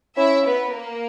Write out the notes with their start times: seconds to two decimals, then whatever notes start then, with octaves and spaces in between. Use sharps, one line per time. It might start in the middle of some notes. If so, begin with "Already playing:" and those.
0.17 C#4 E4 E5
0.46 B3 B4
0.74 A#3 A#4